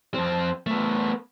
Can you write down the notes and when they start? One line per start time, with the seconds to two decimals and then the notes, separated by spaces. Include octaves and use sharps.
0.14 F2 C4
0.67 A3 B3